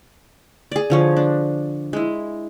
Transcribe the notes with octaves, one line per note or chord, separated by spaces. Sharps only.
G#4 D5
D3 F3 C#5
D4
G#3 E4